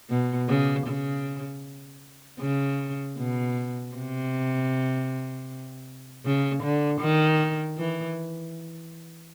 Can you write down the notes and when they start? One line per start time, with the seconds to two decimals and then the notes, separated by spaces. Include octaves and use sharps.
0.10 B2
0.49 C#3
0.87 C#3
2.40 C#3
3.17 B2
3.95 C3
6.25 C#3
6.63 D3
7.01 D#3
7.78 E3